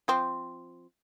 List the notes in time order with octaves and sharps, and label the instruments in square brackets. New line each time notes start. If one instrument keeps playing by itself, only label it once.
[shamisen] F3 C4